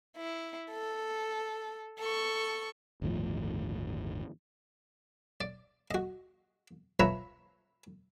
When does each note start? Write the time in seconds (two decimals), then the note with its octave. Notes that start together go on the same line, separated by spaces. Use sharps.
0.17 E4
0.71 A4
2.00 A4 C#6
3.02 G1 D#2 A2 F3
5.41 D5
5.91 F#4 D#5
7.00 F3 B4 C#5 E5 A#5